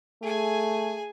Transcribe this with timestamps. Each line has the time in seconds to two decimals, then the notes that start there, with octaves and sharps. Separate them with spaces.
0.23 A3 G#4 G#5